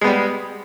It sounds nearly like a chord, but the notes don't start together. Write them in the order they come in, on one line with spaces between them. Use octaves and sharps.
G#3 B3 G3